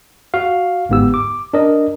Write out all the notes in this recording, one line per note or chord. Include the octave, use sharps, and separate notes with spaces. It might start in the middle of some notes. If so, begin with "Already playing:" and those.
F#4 F5
G1 G#2 B3 G4 E6
D6
D4 A#4 D5 D#5